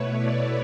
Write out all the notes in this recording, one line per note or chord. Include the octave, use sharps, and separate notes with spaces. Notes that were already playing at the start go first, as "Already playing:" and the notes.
Already playing: B2 A3 E4 B4 C#5
D5